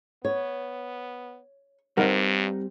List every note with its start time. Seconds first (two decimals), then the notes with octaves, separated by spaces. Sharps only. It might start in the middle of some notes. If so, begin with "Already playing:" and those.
0.25 B3 C#5
1.97 G2 G3 C4 D#4 A#4 F#5